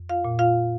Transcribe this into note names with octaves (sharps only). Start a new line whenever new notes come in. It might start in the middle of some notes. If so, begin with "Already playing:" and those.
Already playing: F2
F4 F5
A#2
F4 F5